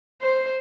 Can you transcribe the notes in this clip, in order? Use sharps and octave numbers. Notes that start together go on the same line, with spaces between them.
C5